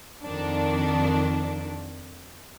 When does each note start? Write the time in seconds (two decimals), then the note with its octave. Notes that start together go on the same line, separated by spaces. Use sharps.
0.23 F2 D#3 D4